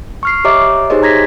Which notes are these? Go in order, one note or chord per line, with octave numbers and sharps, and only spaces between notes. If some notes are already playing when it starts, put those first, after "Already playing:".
C#6 F6 C7
G4 C#5 D#5 E5 A#5 D6
D#4 G4 G#4 C5 C#5 D#5
A#5 G#6 A#6 B6